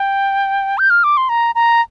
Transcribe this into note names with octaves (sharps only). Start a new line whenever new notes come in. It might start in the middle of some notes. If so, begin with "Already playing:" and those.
Already playing: G5
G6
F6
D6
C6
A#5
A#5